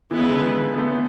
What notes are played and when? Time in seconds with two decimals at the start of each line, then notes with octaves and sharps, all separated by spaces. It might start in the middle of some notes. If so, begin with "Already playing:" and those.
0.10 E3 G#3 B3 E4 G#4 B4
0.21 C#3
0.31 D3
0.41 E3
0.74 B3
0.78 A3
0.92 B3